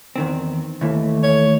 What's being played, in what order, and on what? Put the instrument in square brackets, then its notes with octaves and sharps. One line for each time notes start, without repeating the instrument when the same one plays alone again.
[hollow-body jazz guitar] E2 D#3 C4
[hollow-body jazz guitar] D#2 E3 [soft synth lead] A3
[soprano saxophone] C#5